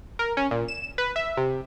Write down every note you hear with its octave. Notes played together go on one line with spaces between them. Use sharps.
A#4
C#4
A#2
E7
B4
E5
C3